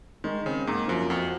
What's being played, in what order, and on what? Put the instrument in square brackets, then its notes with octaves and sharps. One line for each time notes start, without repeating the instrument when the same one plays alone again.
[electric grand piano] D#3 [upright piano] G#3
[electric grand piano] C#3 [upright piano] C4
[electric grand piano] G#2 [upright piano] A#3
[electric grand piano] F#2 [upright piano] F3
[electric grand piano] F2 [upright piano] F#4